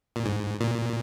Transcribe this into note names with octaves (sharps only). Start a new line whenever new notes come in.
A#2
G#2
A#2